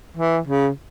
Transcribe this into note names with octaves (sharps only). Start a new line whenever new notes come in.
E3
C#3